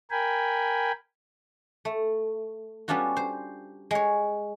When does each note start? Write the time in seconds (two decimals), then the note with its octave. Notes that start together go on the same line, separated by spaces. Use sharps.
0.11 A#4 G5 G#5 B5
1.85 A3
2.88 G3 B3 C#4 D4 F4 F#4
3.17 C5
3.91 G#3 C#5